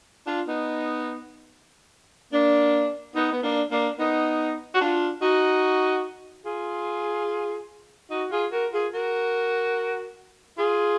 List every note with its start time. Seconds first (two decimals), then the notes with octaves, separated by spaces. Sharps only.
0.27 D4 F4
0.48 B3 D#4
2.33 A#3 D4
3.16 B3 D#4
3.33 B3
3.43 A#3 D4
3.71 A#3 D4
3.98 B3 D#4
4.75 F#4
4.81 D4 F4
5.22 D#4 F#4
6.46 F4 G#4
8.11 D#4 F#4
8.31 F4 G#4
8.52 F#4 A#4
8.73 F4 G#4
8.94 F#4 A#4
10.58 F4 G#4